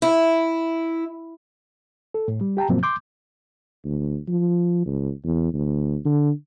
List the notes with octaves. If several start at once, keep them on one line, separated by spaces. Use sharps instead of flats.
E4
A4
A2
G3
G4 G5 A5 A#5
G2 B2 F3 F#3 A#3 C4
C6 D6 G6
D2
F3
C#2
E2
D2
D3